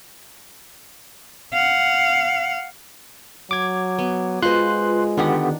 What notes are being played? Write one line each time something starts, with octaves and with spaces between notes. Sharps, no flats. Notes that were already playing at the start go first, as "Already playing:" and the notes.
F5 F#5
F#3 D6 G#6
B3
G#3 F4 F#4 B4 C5 D#5 C6 F#6
D3 D#3 B3 D4 G4 F#5